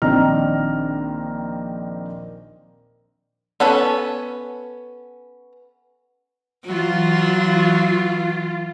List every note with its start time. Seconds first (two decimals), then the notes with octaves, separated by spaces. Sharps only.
0.02 A#1 D#3 C4 D4 A#5 F6
3.60 B3 C#4 A4 B4
6.66 E3 F#3 F4